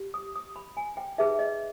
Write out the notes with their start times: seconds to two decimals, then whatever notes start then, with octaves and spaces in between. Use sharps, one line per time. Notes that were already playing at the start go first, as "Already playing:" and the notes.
Already playing: G4
0.14 D#6
0.35 D#6
0.56 B5
0.77 G#5
0.97 G5
1.18 D#4 G#4 B4 E5
1.39 D#5